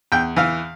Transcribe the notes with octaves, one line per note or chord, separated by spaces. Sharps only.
E2 G5
E3 F5